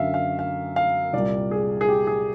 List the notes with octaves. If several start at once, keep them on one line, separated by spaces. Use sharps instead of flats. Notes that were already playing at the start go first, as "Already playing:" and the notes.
Already playing: F#2 D3 F#3 E5 F5
F5
F5
F5
C2 A#2 G3 D5
G#4
G#4
G4
G#4